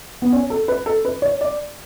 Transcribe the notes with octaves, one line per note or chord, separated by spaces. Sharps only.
B3
C#4
A4
B4
A4
B4
C#5
D5